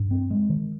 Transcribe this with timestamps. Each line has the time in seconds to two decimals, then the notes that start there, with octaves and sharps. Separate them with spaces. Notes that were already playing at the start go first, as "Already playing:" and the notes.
Already playing: G2
0.11 C4
0.31 G#3
0.50 D#3